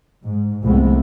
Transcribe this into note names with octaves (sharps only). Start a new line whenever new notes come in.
G#2
C2 F2 G#3 A3 B3